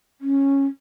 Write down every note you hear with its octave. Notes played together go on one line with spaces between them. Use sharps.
C#4